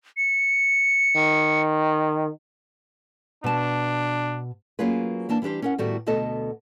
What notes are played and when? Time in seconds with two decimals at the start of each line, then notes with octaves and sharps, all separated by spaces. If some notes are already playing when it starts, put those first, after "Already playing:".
0.17 C#7
1.16 D#3
3.44 B2 D4 A5
4.79 F#3 A#3 C#4 F4 G#4 B4
5.29 E3 A#3 D4 A5
5.42 E3 G3 D4 G4 C5
5.62 C#4 A#4 F#5
5.78 A2 D#3 G3 A3 B3 F#4
6.07 D2 B2 B3 A4 D#5